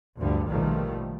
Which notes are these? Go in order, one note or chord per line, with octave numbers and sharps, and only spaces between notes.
D2 G2 D3 F3 G3
A#1 B2 D#3 F3 G3 A3